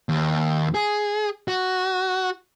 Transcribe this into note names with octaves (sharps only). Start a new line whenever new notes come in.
D#2
G#4
F#4